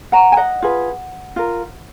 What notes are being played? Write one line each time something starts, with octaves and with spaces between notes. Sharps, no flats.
F#5 A#5
G#5
D#5 F#5
F4 G#4 B4
F4 A#4